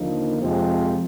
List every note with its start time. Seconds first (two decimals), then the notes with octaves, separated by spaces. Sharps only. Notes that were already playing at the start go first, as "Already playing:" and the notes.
Already playing: D#2 D3 F3 A#3 D#4
0.39 F2 C3 F3 G#3 C4